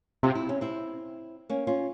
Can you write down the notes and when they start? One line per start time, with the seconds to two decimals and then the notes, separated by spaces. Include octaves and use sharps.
0.23 C3 F4
0.35 E4
0.49 C#4
0.61 C4 E4
1.50 A#3 C#4
1.67 C#4 F4